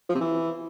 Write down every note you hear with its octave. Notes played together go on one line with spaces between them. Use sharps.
F3
C3
E3